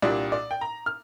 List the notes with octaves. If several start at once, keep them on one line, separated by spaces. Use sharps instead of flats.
C2 A#2 G3 D4 D5
D5
G5
A#5
F6